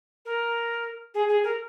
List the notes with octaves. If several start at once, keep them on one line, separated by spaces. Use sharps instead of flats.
A#4
G#4
G#4
A#4